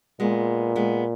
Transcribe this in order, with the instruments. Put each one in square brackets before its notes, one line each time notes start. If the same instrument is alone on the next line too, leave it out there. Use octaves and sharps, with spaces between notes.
[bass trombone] A#2 [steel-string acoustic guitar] G#3 B3
[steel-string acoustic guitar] G#3 B3